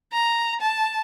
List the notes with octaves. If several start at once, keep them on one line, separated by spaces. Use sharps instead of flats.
A#5
A5